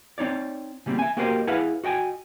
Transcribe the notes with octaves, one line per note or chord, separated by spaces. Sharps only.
C4 D#4 C#5 D5
C#3 G3 A#3 C4
E5 G#5
A#3 F#4 G4 A#4 C5 D#5
E4 G#4 B4 F5 F#5
F#4 D#5 G5 G#5